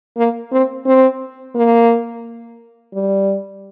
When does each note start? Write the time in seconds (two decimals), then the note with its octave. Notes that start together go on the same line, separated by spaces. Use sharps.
0.17 A#3
0.52 C4
0.86 C4
1.55 A#3
2.93 G3